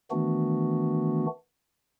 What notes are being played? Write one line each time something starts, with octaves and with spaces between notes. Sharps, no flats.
D#3 E3 A3 B3 D4 F#4